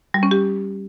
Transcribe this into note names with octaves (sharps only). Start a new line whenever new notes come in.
G3
C#4
G4